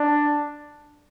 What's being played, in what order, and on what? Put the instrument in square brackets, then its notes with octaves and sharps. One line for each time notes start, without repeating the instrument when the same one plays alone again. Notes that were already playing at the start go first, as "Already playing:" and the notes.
Already playing: [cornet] D4